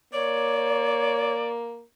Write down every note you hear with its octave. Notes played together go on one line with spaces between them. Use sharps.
A#3 C#5 D5